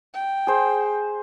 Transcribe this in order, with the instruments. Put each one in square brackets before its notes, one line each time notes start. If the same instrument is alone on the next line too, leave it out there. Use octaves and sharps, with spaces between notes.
[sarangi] G5
[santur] G#4 C5